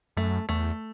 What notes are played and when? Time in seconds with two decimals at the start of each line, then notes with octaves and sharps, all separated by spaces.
0.17 F#2 A3
0.49 E2 A3